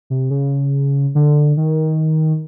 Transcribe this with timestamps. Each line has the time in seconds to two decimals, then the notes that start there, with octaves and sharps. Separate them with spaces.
0.10 C3
0.30 C#3
1.15 D3
1.57 D#3